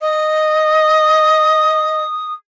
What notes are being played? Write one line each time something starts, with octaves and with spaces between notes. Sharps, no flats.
D#5 D#6